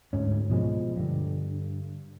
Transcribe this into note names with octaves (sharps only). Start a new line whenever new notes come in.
D2 G#2 C#4
B2 F3 G#3
G2 D3